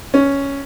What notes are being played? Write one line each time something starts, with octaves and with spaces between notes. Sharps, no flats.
C#4